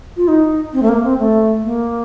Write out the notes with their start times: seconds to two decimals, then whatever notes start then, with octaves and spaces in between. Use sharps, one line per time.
0.17 F4
0.28 D#4
0.73 C4
0.83 A3
0.89 A#3
1.03 C4
1.19 A3
1.64 A#3